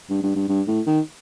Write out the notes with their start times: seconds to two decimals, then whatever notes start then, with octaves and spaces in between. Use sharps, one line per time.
0.10 G2
0.23 G2
0.35 G2
0.48 G2
0.67 A2
0.86 D#3